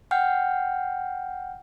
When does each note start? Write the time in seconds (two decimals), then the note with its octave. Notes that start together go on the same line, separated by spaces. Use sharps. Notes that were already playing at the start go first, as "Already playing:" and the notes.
0.11 F#5 G5 F6 G6